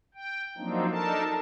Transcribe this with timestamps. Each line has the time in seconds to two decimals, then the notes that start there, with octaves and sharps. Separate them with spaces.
0.14 G5
0.57 F3 F#3 A#3 C4 D4 D#4
0.90 D4 D#4 A4 A#4 A5